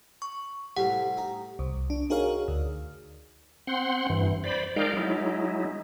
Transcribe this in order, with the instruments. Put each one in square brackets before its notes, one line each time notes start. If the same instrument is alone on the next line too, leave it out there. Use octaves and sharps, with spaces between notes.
[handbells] C#6
[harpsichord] A2 C3 G3 [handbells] F#5
[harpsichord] D#4
[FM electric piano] C2
D4
D#4 F#4 G#4 A#4 C#5 F5
D2
[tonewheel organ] C4 F#5 C6
G2 E3
C5 D5 B5
G#3 D#4 A#4 D5 F5 G5
F#3 G#3 D#4 E4